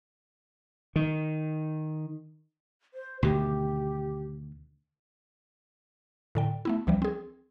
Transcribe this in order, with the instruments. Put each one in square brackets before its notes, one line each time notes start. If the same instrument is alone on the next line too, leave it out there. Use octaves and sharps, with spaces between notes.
[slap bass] D#3
[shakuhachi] C5
[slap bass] D2 B2 D#3 [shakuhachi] G4
[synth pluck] A2 D3 G5
A3 B3 E4
C#2 E3 F3 G3
C4 G#4